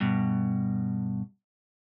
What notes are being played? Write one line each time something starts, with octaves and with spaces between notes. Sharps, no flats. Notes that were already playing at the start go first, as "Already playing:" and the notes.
G2 B2